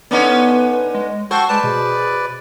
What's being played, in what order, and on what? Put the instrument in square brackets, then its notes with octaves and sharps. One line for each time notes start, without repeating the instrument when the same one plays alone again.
[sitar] D3 C#4 D#4 [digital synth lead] B3 [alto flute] B4
[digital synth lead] G#3
[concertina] F#4 A4 G5 [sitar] C5 [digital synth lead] C#6
[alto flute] G#3 [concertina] B4 D5 [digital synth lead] A5
[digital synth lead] B2 [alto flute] G#4